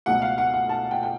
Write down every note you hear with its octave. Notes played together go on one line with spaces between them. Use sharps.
C#2 B2 F#3 A3 F#5
F5
F#5
F#5
A5
G5
G5